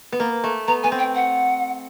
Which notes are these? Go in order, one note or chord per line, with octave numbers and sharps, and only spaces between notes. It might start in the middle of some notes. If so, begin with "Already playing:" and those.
B3
A#3
A3
B3 A#5
B3 G#5
C4
G5
F#5